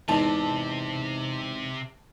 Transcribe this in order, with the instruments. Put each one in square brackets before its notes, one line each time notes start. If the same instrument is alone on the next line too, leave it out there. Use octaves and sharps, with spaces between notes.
[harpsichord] E2 G#2 [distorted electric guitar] C3 [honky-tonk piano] A5